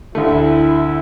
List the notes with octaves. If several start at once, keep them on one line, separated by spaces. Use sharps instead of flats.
D2 D3 A3 E4